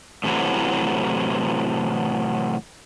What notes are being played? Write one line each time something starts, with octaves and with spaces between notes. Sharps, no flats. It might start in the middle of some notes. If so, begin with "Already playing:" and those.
A2 C3 E3 F#3